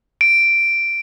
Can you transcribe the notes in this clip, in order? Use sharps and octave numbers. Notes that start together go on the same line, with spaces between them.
D7